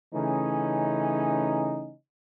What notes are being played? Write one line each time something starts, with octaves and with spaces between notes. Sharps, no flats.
C#3 E3 A3 C#4 D#4